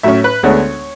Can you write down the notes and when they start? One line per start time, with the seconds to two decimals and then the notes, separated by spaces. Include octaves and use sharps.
0.03 A2 F#3 C#4 E5
0.24 B4
0.43 D2 D3 G#3 B3 D4 C#5